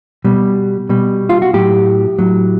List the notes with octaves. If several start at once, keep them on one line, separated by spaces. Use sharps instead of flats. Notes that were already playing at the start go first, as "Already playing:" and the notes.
B2 G3
B2 G3
F4
F#4
A2 F#3 G4
A2 F#3